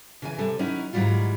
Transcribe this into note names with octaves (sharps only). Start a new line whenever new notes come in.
C#3 E3 G#5
C3 G3 A4
D#3 F#3 C#4 D#4 E4
G#2 D#3 F#3 G3 E4 F4